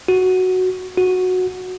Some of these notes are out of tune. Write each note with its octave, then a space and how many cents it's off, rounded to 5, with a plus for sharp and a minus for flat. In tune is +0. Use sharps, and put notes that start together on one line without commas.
F#4 +0
F#4 -10